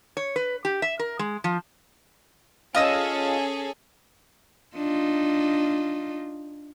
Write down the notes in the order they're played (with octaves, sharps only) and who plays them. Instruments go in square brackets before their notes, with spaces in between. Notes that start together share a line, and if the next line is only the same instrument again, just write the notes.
[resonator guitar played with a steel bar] C#5
B4
G4
E5
A#4
G#3
F3
[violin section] C#4 G#4 A4 [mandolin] F4 D#5 E6
[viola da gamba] D4 D#4 F4